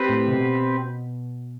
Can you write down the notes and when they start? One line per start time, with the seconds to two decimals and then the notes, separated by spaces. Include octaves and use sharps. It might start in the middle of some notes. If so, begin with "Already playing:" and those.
Already playing: C4 G4 B4
0.09 A2
0.28 C3
0.32 B2